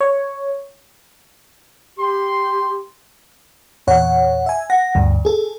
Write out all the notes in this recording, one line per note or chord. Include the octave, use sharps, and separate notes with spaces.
C#5
G4 C6
E2 A#2 C#5 F#5
E5 G#5
F#5 A#6
D2 G2
G#4 A4